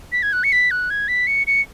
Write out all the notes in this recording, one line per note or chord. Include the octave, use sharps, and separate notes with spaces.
B6
G#6
F#6
C#7
B6
F#6
G#6
B6
C#7
C#7